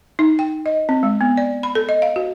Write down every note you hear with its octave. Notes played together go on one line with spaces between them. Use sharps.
D#4
G5
D#5
C4
G#3
B3
D5
B5
A4
D#5
F5
F#4